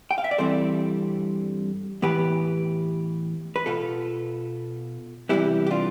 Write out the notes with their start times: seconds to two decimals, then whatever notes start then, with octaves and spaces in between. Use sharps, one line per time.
0.11 G5
0.18 F5
0.24 E5
0.31 D5
0.38 G2 E3 G3 C4 A4 C5
2.02 A2 E3 B3 G4 B4
3.56 B4
3.66 B2 B3 F4 A4
5.29 C3 E3 G3 B3 E4 G4
5.67 G4
5.71 D4 F4